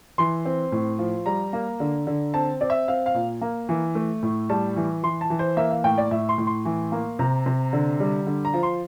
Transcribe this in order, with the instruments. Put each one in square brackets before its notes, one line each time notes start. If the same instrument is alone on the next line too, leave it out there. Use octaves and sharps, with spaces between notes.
[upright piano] E3 C6
C4
A2
F3
G3 A#5
A#3
D3
D3
C4 A5
C4 D5
E5
C4 F5
F5
A#2
A#3
E3
A3
A2
G3 A5
E3
E3 C6
A5
E3
C5
A#3 E5
F5
A2 G5
D5
A2 E5
C6
A2
C6
E3
A#3
C3 A#5
C3
D3
G3
D3
A#5
F3
C6